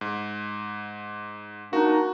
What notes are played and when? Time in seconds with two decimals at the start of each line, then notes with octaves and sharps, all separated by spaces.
0.01 G#2
1.73 A#3 D4 D#4 F#4